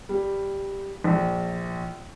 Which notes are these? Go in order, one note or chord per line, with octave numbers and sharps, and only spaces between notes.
G3
A#1